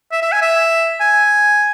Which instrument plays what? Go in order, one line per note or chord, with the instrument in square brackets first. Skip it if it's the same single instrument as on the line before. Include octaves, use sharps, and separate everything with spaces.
[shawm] E5
E5
G#5
E5
G#5